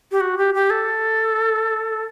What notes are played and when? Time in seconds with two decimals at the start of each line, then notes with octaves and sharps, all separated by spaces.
0.11 G4
0.21 F#4
0.38 G4
0.54 G4
0.70 A4